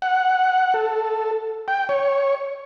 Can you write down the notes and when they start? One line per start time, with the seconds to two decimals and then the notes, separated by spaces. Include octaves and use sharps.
0.02 F#5
0.74 A4
1.68 G5
1.89 C#5